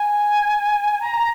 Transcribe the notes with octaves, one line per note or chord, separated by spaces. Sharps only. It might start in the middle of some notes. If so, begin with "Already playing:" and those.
Already playing: G#5
A#5